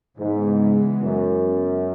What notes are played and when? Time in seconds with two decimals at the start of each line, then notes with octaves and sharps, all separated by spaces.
0.18 G#2 C#3 E3 G#3 B3
1.02 F#2